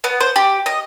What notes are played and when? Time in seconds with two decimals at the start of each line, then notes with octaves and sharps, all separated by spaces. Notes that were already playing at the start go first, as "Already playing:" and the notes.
0.04 B3
0.20 C5
0.36 G4
0.66 D#5